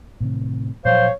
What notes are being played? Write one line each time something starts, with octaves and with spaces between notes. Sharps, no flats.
A2 C3 D#3
A#2 F3 F#3 C5 C#5 F5